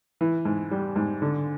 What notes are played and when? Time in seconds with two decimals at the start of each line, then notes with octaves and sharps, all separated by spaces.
0.21 E3
0.45 G#2
0.71 G3
0.96 G#2
1.22 D3